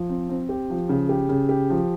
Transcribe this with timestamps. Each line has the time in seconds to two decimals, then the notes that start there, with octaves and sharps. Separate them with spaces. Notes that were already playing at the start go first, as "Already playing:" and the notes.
Already playing: F3
0.09 C4
0.29 C4
0.49 G4
0.70 F3
0.89 C#3
1.09 G4
1.29 C#3
1.49 G4
1.70 F3